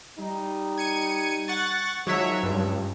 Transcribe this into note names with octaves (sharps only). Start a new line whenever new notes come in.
G3 D#4
G#6 C#7 D#7
F#5 C#6 A6
D#3 F3 F#3 G#3 C#5 E5
C#2 G2